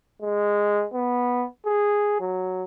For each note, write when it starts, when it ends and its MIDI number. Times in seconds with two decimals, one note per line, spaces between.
0.22 0.86 56
0.94 1.46 59
1.66 2.17 68
2.20 2.64 54